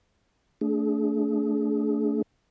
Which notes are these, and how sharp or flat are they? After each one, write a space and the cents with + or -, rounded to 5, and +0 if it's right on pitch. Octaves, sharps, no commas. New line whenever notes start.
A3 +15 D4 -20 G#4 +20